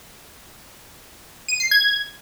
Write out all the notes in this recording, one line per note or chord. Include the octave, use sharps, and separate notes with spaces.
D#7
C7
G#6